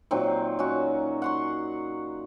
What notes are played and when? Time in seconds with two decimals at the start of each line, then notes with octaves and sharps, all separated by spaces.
0.11 A#2 D#3 F#3 C4
0.59 C#4 D#4 F#4
1.22 F#5 C6 C#6